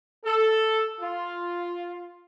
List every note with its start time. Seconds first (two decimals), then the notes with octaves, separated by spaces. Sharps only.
0.25 A4
1.01 F4